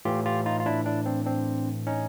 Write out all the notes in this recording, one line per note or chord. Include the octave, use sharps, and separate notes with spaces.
A2 E3 F4 G4
F4 G4
D#4 F4
F4
D4 E4
D4 E4
C4 D4
C4 D4
C#4 D#4